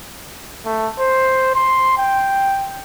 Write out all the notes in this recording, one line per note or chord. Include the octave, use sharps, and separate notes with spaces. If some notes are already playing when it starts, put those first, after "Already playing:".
A3
C5
C6
G5